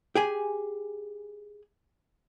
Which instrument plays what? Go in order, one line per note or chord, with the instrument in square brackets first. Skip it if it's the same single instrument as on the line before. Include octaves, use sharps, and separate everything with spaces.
[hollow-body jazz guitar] G4 G#4 G#5